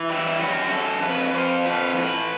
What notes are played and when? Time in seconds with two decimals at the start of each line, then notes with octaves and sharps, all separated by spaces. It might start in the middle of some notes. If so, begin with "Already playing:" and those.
Already playing: E3
0.09 G3 E4
0.41 F#2 F#4
0.71 F#2 A4
1.03 F2 B4
1.30 B4
1.33 F2 C5
1.65 F3 B4
1.96 A2 B4